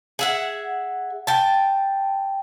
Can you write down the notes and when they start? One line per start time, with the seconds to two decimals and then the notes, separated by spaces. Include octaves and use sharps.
0.19 G#4 E5 F#5
1.27 G5 A5